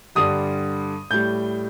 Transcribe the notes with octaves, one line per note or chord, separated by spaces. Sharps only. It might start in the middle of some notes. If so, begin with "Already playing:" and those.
G2 D3 G3 D#6
A2 G3 G6